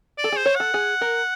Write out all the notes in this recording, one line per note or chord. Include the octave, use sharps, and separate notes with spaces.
D5
A4
G#4 C5
C#5
A4 F#5
G#4
A#4